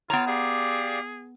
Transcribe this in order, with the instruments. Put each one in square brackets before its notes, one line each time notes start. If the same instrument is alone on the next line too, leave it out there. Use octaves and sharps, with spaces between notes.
[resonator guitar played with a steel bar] B3 A#5 [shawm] F4 [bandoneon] C#5
[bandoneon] G4 D5 F5 [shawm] G#4